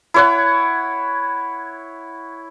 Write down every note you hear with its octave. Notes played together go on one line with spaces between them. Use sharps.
E4 C#5 F#5